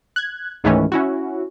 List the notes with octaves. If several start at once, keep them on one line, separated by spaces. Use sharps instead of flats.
F#6 G#6
C#2 G#2 D#3 E3 A3 C#4
C#4 E4 F#4